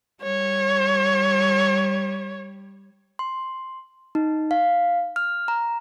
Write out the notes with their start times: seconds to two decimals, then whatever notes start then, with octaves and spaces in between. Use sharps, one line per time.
0.23 G3 C#5
3.19 C6
4.15 D#4
4.51 F5
5.16 F6
5.48 A#5